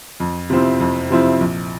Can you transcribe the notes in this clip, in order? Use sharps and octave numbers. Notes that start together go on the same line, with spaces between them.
F2
C3 F3 C4 E4
F2
C3 F3 C4 E4
A#1